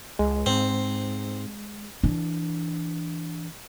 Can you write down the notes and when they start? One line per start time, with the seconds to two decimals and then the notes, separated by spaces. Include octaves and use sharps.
0.19 C#2 G#3
0.46 G#2 C4
2.03 E3 D4